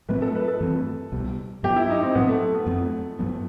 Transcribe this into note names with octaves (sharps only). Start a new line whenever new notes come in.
A2 F#3 A3 C4 B4
A4
B4
A4
G2 E3 A3 C4
C2 B2 G3
G2 F#3 B3 G4
E4
D#4
C4
A2 F#3 B3 C4
A3
B3
F#2 F#3 A3 C4
G2 F#3 B3